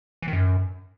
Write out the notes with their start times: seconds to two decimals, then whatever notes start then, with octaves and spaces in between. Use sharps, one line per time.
0.22 E3
0.28 D#3
0.33 F#2